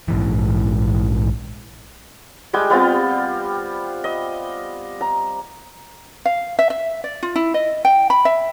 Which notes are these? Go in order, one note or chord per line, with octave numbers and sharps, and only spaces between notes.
A#1 G#2 E3
G3 G#3 G5 G#5
G3 B3 C4 F4
D#5
A#5
F5
E5
E5
D5
F4
E4
D#5
G5
B5
E5